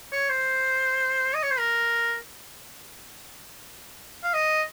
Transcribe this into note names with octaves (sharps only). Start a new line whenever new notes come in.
C#5
C5
D#5
C#5
C5
A#4
F5
D#5